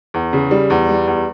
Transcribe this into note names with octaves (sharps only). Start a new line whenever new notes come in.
E2
C#3
G3
E2
G3
E2